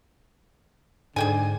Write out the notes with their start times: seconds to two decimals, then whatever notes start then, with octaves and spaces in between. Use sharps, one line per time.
1.16 G#2 D3 G#4 G5 G#5